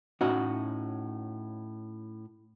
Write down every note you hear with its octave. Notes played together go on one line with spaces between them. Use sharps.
A2 C#4 D#4 F#4